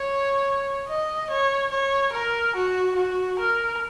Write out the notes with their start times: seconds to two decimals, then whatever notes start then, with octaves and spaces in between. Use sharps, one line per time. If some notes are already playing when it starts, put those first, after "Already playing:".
Already playing: C#5
0.88 D#5
1.31 C#5
1.72 C#5
2.13 A#4
2.56 F#4
2.96 F#4
3.39 A#4